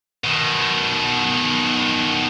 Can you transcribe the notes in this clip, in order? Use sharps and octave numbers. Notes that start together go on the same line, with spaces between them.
B2 D#3